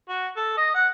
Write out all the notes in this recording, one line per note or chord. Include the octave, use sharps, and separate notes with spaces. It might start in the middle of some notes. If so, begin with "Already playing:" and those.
F#4
A4
D#5
F#5